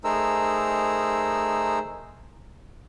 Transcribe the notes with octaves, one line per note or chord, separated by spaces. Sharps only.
A3 D#4 G#4 A#4 C5 E6